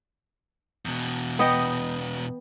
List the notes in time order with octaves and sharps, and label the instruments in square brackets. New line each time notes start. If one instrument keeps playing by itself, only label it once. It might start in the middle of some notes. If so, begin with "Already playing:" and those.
[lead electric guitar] E2 B2
[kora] B3 D#5 G5